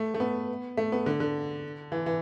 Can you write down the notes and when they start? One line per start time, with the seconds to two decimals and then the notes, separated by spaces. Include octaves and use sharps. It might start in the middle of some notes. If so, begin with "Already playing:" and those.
Already playing: A3
0.14 A3
0.20 B3
0.77 A3
0.92 B3
1.06 D3
1.20 D3
1.92 E3
2.06 E3